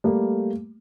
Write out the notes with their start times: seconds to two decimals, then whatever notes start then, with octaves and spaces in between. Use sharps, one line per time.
0.04 G3 A3 A#3